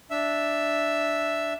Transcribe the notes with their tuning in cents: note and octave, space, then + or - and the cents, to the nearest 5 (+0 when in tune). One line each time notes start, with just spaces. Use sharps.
D4 +0 E5 +0